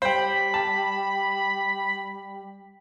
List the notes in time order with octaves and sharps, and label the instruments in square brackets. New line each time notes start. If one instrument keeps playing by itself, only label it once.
[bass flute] G3 [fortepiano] C5 G5 [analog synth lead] B5
[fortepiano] A5